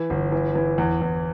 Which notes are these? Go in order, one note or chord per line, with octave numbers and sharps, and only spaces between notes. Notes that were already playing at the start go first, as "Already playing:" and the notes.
Already playing: E3
G1
E3
E3
E2
E2